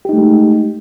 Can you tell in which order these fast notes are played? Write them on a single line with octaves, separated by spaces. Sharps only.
G4 D#4 A3 G#3